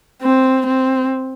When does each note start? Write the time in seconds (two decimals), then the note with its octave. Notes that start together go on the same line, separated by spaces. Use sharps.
0.22 C4
0.67 C4